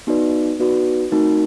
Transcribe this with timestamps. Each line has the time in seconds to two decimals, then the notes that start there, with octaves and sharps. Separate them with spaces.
0.07 B3 D#4 F#4 B4 D5
0.59 B3 D#4 F#4 B4 D5
1.12 A3 C4 D#4 F#4 A#4